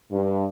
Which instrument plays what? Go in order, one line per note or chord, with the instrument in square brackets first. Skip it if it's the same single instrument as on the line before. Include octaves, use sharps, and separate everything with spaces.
[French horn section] G2